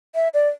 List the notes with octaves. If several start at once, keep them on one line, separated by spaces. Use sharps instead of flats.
E5
D5